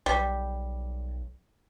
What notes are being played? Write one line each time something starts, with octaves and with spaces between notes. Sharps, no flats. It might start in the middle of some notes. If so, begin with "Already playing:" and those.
B1 G3